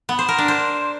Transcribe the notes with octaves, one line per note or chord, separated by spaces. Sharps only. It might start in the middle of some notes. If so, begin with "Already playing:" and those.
B3
C5
A#4
D4
C5